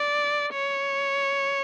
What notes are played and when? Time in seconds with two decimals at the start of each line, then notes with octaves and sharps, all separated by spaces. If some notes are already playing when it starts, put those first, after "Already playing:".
Already playing: D5
0.53 C#5